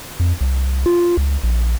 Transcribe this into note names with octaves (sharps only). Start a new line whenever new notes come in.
F2
C2
F4
C#2
A#1